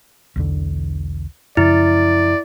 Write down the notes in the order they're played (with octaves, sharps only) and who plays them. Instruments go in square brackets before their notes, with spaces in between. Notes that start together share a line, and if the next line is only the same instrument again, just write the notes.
[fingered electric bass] B1 E2 D3
[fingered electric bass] F#2 C#3 F3 [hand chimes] E4 [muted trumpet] D5